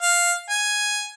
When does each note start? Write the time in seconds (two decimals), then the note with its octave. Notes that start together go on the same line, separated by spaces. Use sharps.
0.02 F5
0.50 G#5